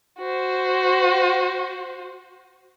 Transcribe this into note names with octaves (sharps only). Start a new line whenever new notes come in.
F#4 C5